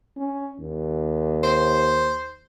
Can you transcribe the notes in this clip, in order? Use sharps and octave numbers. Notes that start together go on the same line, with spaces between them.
C#4
D#2
C5